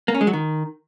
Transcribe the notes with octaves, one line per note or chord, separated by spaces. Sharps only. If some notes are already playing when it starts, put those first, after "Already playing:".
A#3
C#4
G#3
F#3
D#3